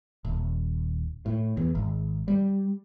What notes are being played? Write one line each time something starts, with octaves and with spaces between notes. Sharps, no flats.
D#1
A2
E2
G#1
G3